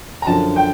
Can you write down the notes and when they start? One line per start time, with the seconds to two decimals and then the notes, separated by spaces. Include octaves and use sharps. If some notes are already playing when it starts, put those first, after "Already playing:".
0.22 A#5
0.27 F#2 D3 F3 A5
0.56 G5